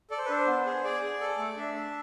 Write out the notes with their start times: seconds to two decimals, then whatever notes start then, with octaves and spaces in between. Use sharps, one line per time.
0.11 A4 D5
0.18 C5
0.25 B4
0.30 D4 C5
0.47 B3
0.66 G#4
0.83 G#4 D5
1.02 G#4
1.21 A4
1.38 A3
1.57 D4 E5
1.75 D4